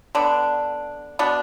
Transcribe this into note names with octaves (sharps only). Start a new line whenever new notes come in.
D3 B3 D4
B2 B3 D4